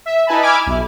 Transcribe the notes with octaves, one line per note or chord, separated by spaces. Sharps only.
E5
D#4 E4 B4 G#5 A5 B5
G#5 B5 D6 E6 F6 G#6
B1 E4